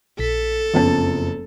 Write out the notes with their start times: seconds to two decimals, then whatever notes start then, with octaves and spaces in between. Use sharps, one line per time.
0.19 A#1 A4 B6
0.74 F#1 F2 F3 B3 C#4 A5